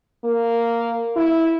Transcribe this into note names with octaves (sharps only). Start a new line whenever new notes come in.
A#3
E4